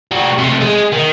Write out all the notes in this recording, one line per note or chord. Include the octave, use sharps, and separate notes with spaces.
G3 F#4
C3 A3
G#3
D#3